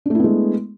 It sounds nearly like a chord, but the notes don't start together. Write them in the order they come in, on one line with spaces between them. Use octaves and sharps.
D4 A3 E4 B3 G#3